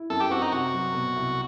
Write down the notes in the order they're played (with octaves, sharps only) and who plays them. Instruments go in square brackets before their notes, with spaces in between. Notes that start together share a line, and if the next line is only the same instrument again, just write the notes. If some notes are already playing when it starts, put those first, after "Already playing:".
Already playing: [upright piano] E4
[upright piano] F#2 [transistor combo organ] A4
[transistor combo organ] G4
[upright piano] C4 [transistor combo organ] F#4
[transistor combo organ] D#4
[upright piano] C3 [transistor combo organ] F#4
[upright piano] F#3
B2
C2